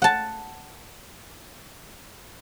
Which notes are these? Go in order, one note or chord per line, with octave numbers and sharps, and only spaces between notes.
F#5 A5